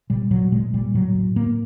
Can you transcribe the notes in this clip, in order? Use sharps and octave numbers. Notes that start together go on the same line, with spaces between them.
A#2 G3
A#2 F#3
A#2 G#3
A#2 G3
A2 F#3
A2
A2 A#3